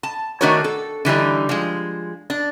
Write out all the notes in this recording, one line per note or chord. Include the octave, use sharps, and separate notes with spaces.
A5
D#3 A3 D4 F#4 A#4 C#5
A4
D3 E3 G3 D#4
F3 G#3
D4